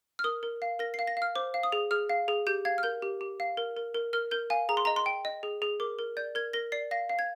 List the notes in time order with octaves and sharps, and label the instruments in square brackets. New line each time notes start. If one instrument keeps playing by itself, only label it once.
[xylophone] F6
A#4 D#6
A#4
F5
A#4 A#6
F5 C7
A#6
F5 F6
C5 D6
F5
D#6
G#4
G#4 F6
F5
G#4
G4 G6
F5 G#6
F6
A#4 G6
G4
G4
F5
A#4
A#4
A#4
A#4 F6
A#4 G6
F5 G#5
G#4 A#5
C6
D#5 A#5
C6
G5
D#5
G#4
G#4
A#4 D6
A#4
D5 G6
A#4 G#6
A#4 A#6
D5 C7
F5 A#6
F5
G#6